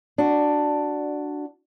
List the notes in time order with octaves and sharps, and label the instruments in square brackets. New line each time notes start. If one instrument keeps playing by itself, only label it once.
[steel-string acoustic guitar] D4 F#4